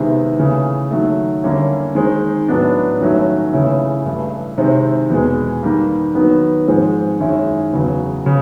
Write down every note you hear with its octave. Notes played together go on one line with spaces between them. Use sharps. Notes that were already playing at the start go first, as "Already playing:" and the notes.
Already playing: C3 D#3 G#3 B3 E4
C#3 E3 A3
D#3 F#3 A3
D3 G3 A#3 C#4 E4
D#3 G#3 C4 D#4
A2 F#3 B3 D4
G2 D#3 F#3 A3 C#4
C#3 E3 A3 C#4 E4
G2 E3 A3
C3 D#3 G#3 C4 E4
E2 B2 G#3
D#3 G3 A#3
D#3 F#3 B3
G#2 F3 G#3 C4
F#2 D#3 G#3 C#4 E4
E2 C#3 F#3
C#3